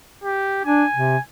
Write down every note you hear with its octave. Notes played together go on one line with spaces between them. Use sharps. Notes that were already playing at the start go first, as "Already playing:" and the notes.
G4
D4 G#5
C3